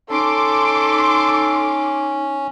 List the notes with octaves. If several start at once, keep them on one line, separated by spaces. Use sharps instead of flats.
C#4 D#4 A4 C6 D6